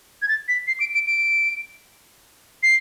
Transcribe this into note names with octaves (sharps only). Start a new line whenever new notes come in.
G#6
A6
B6
C7
D7
D7
D7
C7